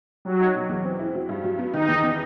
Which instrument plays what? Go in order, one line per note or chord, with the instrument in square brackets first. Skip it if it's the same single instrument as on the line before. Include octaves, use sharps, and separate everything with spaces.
[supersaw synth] F#3 [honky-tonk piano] G3
[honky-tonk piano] D#4
B2
E2
C4
E4
F#3
G2
F#3
B3
[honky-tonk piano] D#3 [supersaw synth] D#4
[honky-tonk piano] E2
B3